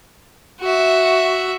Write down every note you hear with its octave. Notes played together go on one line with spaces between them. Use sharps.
F#4 E5